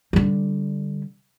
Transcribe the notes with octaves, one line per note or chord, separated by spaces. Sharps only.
D3 G3